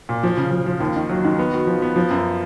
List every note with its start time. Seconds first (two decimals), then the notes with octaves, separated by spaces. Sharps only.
0.09 A#2
0.23 F3
0.37 C#3
0.51 F3
0.66 F3
0.80 D#2
0.96 D#3
1.09 F#3
1.24 D#3
1.39 B3
1.52 F#4
1.67 F3
1.82 B3
1.96 F3
2.11 F#2